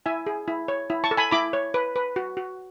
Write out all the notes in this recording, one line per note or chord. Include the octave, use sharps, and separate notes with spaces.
E4 E5 G#5
G#4
E4
C#5
E4
A5 C#6
A4
G#5 B5
E4 B5 D6
C#5
B4
B4
F#4
F#4